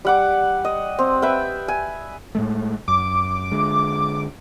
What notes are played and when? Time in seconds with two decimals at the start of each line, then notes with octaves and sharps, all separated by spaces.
0.05 G3 F#5 D6
0.65 D#5
0.99 C4
1.22 B4 E5 G5
1.68 G#5
2.35 A2 G#3 A3
2.88 F#2 D6
3.51 D3 G#3